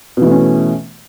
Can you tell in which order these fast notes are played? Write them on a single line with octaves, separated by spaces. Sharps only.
B2 E3 A3 C#4